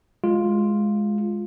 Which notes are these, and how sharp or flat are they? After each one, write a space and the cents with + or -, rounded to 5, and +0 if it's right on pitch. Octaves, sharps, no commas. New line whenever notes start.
G#3 +5 F4 +0